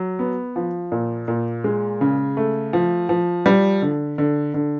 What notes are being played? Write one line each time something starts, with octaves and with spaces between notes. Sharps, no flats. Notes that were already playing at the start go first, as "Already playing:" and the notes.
Already playing: F#3
B3
F3
A#2
A#2
G#3
C#3
A3
F3
F3
G3
D3
D3
D3